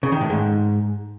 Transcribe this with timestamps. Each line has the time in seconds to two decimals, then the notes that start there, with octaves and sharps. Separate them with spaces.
0.03 C#3
0.12 D#3
0.21 A2
0.30 G#2